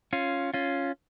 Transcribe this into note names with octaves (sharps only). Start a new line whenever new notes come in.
C#4 F4
C#4 F4